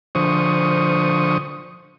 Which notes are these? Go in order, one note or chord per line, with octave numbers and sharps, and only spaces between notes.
D3 F3 C5 C#6 D#6